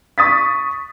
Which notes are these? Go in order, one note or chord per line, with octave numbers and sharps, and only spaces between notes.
C#6 D#6 A6 B6